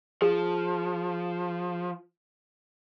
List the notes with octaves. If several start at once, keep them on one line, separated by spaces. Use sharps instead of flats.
F3 G#4